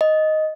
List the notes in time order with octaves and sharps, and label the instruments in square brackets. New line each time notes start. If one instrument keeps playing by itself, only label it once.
[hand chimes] D#5